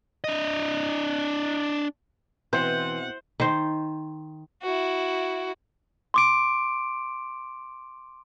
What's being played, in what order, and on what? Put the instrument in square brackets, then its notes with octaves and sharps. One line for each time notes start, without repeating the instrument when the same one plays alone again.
[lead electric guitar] D4 D#5
[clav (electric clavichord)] B2 C4 [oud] E3 [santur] C5 [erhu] F#5
[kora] D#3 C5
[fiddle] E4 F#4
[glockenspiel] C6 D6 D7